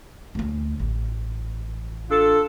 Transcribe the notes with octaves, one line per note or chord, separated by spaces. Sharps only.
D2 C#4
A1
D4 F4 A4